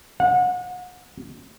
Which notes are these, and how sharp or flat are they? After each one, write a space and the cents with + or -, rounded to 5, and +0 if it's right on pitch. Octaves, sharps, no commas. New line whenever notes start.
F#5 -35